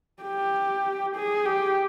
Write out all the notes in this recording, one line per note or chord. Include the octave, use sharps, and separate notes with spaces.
G4
G#4
G4